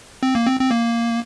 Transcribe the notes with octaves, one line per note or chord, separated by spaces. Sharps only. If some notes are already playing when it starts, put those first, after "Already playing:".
C4
A#3
C4
C4
A#3